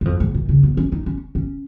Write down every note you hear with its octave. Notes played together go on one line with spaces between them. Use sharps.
F#2
F2
G#2
A#2
C#3
B3
C#4
D#4
C#4
C#4